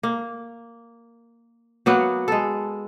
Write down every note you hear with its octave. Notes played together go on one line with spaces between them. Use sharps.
A#3
F#3 A#3 B3 F#4
G#3 A4